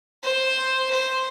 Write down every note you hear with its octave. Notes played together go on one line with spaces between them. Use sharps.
C5
C5